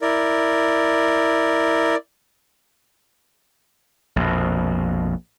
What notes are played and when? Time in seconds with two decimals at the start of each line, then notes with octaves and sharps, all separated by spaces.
0.02 E4 A#4 D5
4.16 A#1 F2 B2